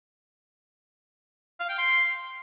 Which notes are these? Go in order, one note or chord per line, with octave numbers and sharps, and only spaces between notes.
F5
G5
C6